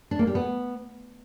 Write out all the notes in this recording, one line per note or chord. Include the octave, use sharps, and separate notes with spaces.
D4
A#3
G3
B3